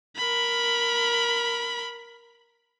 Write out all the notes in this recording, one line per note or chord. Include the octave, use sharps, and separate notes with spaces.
A#4 B5